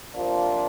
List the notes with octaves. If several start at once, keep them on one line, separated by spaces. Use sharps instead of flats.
C3 F3 A#3 D4 F4